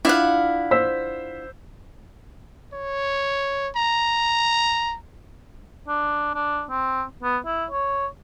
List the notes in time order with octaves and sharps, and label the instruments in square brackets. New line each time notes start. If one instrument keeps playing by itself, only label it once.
[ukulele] D4 F4 [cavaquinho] E4 F5 F#5
[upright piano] C5 E6 B6
[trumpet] C#5
A#5
[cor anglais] D4
D4
C4
B3
E4
C#5